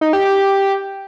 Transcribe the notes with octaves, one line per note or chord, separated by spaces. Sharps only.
D#4
G4
G4